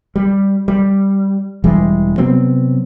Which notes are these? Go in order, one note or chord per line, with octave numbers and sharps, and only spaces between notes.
G3
G3
E1 E3 G3 G#3
C3 F#3 B3 C4